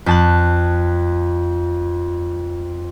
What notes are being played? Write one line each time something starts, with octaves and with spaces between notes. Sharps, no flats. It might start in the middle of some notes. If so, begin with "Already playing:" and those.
F2 A5 F#6